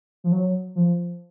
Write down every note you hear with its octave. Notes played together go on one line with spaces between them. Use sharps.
F3
F#3
F3